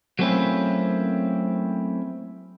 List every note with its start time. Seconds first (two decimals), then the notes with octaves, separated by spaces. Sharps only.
0.19 F#3 A3 A#3 C4 C#4 E4